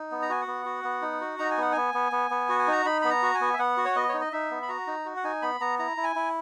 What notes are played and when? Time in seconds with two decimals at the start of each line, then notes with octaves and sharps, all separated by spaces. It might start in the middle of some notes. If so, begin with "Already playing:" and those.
Already playing: D#4
0.11 B3
0.22 A#5
0.29 F#4 G#5
0.41 F#5
0.47 B3
0.66 F#4
0.84 B3
1.02 D#4
1.21 F#4
1.39 D#4 A#5
1.51 G#5
1.57 B3 F#5
1.72 B3 G#5
1.94 B3
2.12 B3
2.31 B3
2.49 F#4
2.59 G#5
2.68 D#4 A#5
2.86 D#4 B5
3.02 B3 B5
3.10 A#5
3.23 F#4
3.35 G#5
3.41 B3
3.54 E5
3.59 B3 F#5
3.77 F#4
3.85 C#5
3.96 B3 D#5
4.09 D#4 C#5
4.21 D#5
4.32 D#4 E5
4.51 B3
4.62 B5
4.69 F#4 A#5
4.87 D#4
5.05 F#4
5.17 F#5
5.24 D#4 G#5
5.42 B3 B5
5.60 B3 A#5
5.79 E4 A#5
5.97 E4
6.03 G#5
6.16 E4